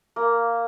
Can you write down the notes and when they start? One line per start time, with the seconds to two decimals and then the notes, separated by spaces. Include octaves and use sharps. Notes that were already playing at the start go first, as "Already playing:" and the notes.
0.16 A#3